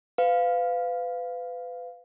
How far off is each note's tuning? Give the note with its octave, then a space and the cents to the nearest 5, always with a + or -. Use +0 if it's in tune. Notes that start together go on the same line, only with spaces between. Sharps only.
B4 +30 F5 +0